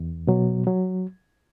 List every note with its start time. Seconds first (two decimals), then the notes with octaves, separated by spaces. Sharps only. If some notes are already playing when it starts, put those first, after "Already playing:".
Already playing: E2
0.27 B2 F#3
0.67 F#3